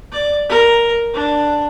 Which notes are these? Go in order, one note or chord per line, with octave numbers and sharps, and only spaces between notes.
D5
A#4
D4